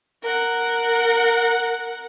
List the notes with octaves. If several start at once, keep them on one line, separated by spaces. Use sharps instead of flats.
A#4 F#5